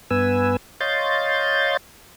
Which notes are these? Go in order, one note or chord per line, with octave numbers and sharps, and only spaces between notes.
G2 B3 B4 G#5 E6
C#5 D#5 F5 C6 G6 A6